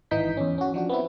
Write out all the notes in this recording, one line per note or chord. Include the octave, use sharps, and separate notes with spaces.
G#1 E3 D#4 G6 B6
E2 C#4
C#4 F#4
F3 D4 F#4
B3 C4 E4